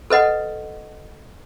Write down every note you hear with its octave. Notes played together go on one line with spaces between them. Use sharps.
A4 B4 D#5 F#5